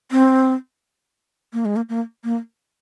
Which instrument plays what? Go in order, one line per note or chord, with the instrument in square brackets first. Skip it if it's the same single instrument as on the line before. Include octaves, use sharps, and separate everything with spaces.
[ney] C4
A#3
G#3
A#3
A#3
A#3